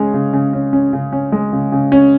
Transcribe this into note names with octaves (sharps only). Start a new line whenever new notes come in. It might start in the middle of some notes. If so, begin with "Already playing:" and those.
Already playing: C#3 G#3 C#4 G#4
C#3
C#3
C#4
C#4
C#3
C#4
G#3
C#3
C#3
C#4